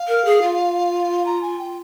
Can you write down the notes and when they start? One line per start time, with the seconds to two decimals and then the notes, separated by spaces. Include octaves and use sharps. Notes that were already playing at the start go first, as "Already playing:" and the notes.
Already playing: F5
0.08 A#4
0.25 G#4
0.42 F4
1.26 A#5
1.42 G#5
1.59 G5